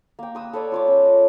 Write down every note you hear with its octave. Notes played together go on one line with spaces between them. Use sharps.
A#3 G5
B4 D#6 E6
A4 B4 C#5 D5
F4 C#5 D6
C#4 B4
D#5